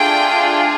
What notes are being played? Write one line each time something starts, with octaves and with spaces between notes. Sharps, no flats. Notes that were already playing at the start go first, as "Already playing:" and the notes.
Already playing: A3 D4 F4 G#4 G5